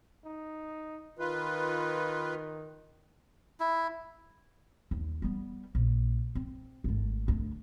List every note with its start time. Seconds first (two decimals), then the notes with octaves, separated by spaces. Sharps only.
0.25 D#4
1.19 D#3 F4 B4
3.60 E4
4.91 D#2
5.22 G3 B3
5.75 A#1
6.35 C4
6.84 G#1 A3
7.28 D2 D4